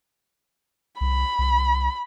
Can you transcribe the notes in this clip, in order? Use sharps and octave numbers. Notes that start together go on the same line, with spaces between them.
C2 B5
C2